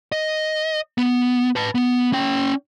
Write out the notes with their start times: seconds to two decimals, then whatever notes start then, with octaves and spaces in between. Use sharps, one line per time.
0.12 D#5
0.98 B3
1.56 B4 A5
1.75 B3
2.13 C#4 G5